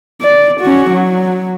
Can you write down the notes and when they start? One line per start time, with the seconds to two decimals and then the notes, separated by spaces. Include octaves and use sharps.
0.22 D5
0.61 C#4 F#4
0.91 F#3